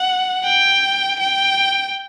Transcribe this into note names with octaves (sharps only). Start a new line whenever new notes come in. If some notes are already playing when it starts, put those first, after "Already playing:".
Already playing: F#5
G5
G5